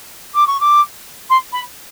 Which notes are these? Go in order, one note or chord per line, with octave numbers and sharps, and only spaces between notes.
D6
C#6
D6
C6
B5